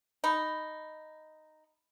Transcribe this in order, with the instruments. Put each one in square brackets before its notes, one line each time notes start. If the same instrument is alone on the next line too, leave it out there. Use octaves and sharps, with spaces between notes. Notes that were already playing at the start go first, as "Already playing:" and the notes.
[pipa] D#4 [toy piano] B5